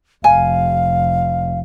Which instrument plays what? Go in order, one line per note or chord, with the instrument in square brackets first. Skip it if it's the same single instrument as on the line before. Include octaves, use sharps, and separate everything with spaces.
[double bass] F1 [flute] F5 [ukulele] G#5